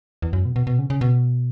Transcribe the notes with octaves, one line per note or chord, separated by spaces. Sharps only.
E2
F#2
B2
B2
B2
C#3
C#3
B2